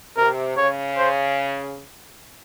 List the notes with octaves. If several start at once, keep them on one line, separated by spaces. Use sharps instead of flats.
C3 A#4
C#3 C#5
C5